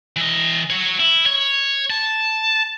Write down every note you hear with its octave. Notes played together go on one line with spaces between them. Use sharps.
E3 D#5
F#4 C#5
E4
C#5
A5